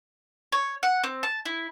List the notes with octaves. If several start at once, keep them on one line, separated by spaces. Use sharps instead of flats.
C#5
F#5
C4
A5
E4